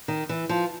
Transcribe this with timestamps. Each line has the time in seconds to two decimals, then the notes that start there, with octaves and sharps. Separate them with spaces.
0.08 D#3
0.29 E3
0.49 F3